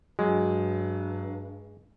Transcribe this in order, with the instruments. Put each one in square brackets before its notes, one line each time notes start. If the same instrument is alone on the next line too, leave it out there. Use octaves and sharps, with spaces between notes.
[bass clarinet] G2 [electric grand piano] F#3 [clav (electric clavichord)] G#3